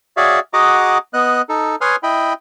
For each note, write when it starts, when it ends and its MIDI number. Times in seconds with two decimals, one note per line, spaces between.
0.17 0.40 66
0.17 0.40 68
0.17 0.40 73
0.17 0.40 74
0.17 0.40 76
0.17 0.40 77
0.53 0.98 66
0.53 0.98 68
0.53 0.98 75
0.53 0.98 78
0.53 0.98 82
0.53 0.98 86
1.14 1.42 59
1.14 1.42 75
1.14 1.42 90
1.49 1.76 63
1.49 1.76 69
1.81 1.96 71
1.81 1.96 73
1.81 1.96 80
1.81 1.96 84
1.81 1.96 87
1.81 1.96 89
2.03 2.33 64
2.03 2.33 75
2.03 2.33 79
2.03 2.33 83